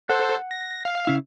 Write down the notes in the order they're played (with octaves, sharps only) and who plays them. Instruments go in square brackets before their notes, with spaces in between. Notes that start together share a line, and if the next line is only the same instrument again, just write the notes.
[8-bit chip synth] A4 C5 [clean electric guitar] F#5
[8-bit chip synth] A#6
F5
[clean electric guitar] C#3 E4